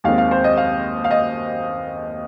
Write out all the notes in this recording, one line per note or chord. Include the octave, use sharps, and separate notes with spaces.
D#2 D#3 G#3 C4 F5
F5
C5
D#5
F5
F5
D#5